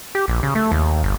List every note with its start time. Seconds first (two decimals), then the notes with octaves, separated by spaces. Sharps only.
0.15 G4
0.28 A#1
0.43 C#3
0.55 A3
0.72 D#2
1.03 G1